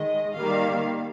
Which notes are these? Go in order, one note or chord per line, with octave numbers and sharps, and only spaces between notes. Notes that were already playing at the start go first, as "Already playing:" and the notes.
Already playing: D#3 G#3 D#5
D#3 G3 A#3 F5